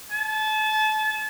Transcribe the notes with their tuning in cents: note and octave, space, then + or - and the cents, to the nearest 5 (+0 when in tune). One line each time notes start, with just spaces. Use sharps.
A5 -30